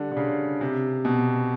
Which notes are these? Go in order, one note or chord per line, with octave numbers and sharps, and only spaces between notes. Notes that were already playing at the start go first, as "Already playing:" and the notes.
Already playing: D3 G3
D3
C#3
C3
B2